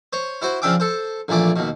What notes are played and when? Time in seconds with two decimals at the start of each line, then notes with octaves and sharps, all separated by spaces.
0.13 C5 C#5
0.42 E4 F#4 C5
0.62 C#3 F3 D4 E5 G5 D6
0.80 A4 C5
1.28 A#1 A#2 E3 A3 D6
1.56 D#2 B2